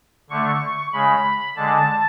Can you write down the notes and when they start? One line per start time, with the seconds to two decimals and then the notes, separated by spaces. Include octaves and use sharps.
0.30 D3 A3 C#6
0.93 C#3 G#3 B5
1.56 D3 G#3 A5